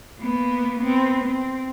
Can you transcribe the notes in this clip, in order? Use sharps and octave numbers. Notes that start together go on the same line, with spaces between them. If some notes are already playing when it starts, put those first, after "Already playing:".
A#3 B3
B3 C4
C4